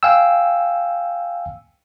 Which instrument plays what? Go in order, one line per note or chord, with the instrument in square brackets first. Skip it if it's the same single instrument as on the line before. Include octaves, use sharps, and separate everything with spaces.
[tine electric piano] F5 G5 G#5 E6